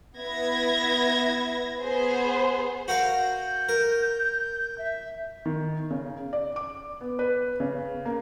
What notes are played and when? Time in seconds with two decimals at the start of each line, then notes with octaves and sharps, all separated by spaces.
0.18 B3 E4 E5 G#6 A#6
1.82 B3 G#4 C5
2.88 F#4 A#4 F5 G6
3.69 A#4
4.78 E5
5.46 D#3
5.90 C#3
6.33 D5
6.56 D6
7.01 B3
7.19 B4
7.60 C#3
8.05 A#3